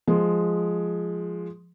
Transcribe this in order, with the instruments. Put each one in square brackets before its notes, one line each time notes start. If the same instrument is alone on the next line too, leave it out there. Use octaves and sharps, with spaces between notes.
[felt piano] F3 G#3